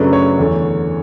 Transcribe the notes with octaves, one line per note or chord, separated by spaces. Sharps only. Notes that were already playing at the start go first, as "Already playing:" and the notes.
Already playing: F#2 C#3 F#3 A3 D4 B4
C#5
E2 D3 A3